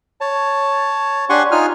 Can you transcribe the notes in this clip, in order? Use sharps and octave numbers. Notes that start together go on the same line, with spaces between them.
C#5 A5
D4 G4 F#5 G#5 C6 C#6
D#4 F4 G#5 F6